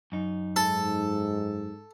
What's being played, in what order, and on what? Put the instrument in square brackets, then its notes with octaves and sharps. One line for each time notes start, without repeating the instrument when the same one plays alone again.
[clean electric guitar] F#2 D#4
[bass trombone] G#2 [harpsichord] A4